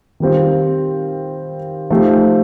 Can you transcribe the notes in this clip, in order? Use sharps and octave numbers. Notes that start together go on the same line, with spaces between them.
D#3 G3 C4 F4
F3 A3 D#4 G4 C5